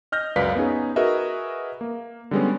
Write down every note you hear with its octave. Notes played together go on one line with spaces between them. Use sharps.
D#5 F6 G6 A#6
C#2 F#2 B4 D5 F5 B6
B3 C#4 D#4 G#4
F#4 G#4 A#4 B4 D#5 E5
A#3
D3 G3 G#3 B3 C#4